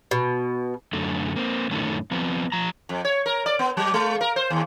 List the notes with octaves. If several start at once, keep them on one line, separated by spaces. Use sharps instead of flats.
B2
F#2 D3 A3
A#3 C4
F#2 A2 D3 D#3 A3 C#4
F3 B3 C4
F3 A#5
F2
C#5
A#4
D5
B3
F#3
G#3
A#4
C5
D#2